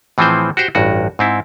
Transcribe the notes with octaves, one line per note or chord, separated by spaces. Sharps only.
A2 E3 F3 C4 G#4 C5
F#4 G4 C5 G5
A1 G2 F#4
G#2 C4 E4